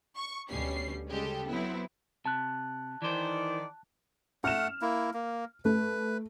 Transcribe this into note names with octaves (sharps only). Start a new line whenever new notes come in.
C#6
D2 B2 G3 C#4 C7
C#3 G3 G#3 G4 A4
F#3 B3 C4 E4
C3 A5 F#6
D#3 E3 C5 D5
A3 F#5 F6 E7
A#3 E4
A#3
A3 B4